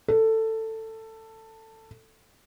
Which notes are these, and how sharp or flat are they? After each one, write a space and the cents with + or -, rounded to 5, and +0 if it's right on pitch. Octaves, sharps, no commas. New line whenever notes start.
A4 +15